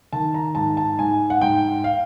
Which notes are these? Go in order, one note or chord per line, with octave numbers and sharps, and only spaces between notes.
D#3 A5
A#5
G#2 A5
A5
G#2 G#5
F#5
G#2 G5
F5